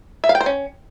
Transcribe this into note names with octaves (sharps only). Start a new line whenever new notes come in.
E5
F5
G5
C5
C#4